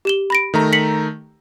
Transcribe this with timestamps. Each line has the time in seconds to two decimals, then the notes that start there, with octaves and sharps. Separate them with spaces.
0.05 G4 E7 G7
0.30 B5 A#6 D7
0.54 D#3 A3 A#5
0.73 B6 C#7 F#7